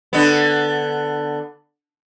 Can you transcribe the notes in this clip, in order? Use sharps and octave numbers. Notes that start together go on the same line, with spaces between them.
D3 B3